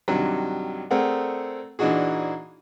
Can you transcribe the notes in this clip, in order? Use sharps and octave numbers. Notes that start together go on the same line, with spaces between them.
G2 C3 D#3 F#3
A3 C4 G#4 A#4 D5 F#5
A#2 E3 D4 D#4 F#4 G#4